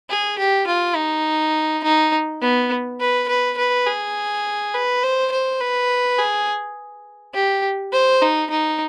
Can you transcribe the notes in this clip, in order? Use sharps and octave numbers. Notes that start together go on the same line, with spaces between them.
G#4
G4
F4
D#4
D#4
B3
B4
B4
B4
G#4
B4
C5
C5
B4
G#4
G4
C5
D#4
D#4